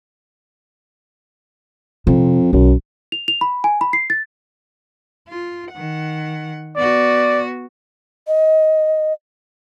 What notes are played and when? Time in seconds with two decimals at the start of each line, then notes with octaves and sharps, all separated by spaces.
2.07 F2 C3
2.53 B1 F#2
3.12 F7
3.28 F7
3.41 B5
3.64 G#5
3.81 B5
3.93 C7
4.10 A6
5.28 F4
5.72 D#3 F#5
6.76 B3 F#4 D5
8.27 D#5